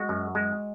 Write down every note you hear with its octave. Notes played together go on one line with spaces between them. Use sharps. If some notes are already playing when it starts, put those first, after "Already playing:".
Already playing: G#3 F#4
F#2
G#3